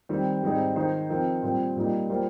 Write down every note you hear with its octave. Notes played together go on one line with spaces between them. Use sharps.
D#3 G3 C4
G#2 G3 C4 D#4 G#4
D#3 G#3 D#4 G#4 C5
F3 C4 D#4 A#4
A#2 G3 C4
A#2 G3 A#3 D#4
G3 A#3 F4 C5